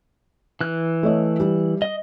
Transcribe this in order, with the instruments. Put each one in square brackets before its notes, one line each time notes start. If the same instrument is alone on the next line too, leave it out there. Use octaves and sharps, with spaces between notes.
[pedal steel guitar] E3 F#6
[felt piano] A3 C#5 D#5
G3
[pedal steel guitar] D#5